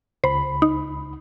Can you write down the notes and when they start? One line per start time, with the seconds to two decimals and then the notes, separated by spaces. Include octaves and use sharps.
0.24 C#2 C5 B5
0.62 D#4